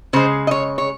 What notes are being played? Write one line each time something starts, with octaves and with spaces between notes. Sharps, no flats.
C#3 G#3 C5
D#5
C#5
C#5